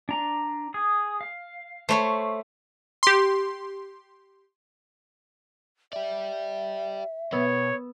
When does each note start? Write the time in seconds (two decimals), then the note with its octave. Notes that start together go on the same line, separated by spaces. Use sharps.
0.09 D4 A#5
0.74 G#4 D#6
1.21 F5
1.89 A3 C5 C#5 B5
3.03 G4 C6
5.93 G4 D5 E5
7.32 B2 B3 C#5 E6